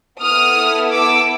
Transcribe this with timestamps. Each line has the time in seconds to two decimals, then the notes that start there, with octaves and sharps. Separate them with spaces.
0.22 B3 E4 A4 D#6 F6
0.93 D6 E6